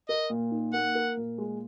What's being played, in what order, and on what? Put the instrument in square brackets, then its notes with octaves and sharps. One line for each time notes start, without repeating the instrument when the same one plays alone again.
[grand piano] A#4 [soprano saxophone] D#5
[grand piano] A#2
D#4
[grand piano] A#3 [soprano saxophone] F#5
[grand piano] A#4
A#2
G#3